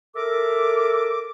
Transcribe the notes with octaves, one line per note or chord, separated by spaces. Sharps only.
A4 A#4 E5 D6